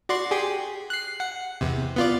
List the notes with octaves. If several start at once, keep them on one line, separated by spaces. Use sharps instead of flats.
F#4 D5 C6
G4 G#4
F#6 C7
F#5
E2 C3
B3 F4 D5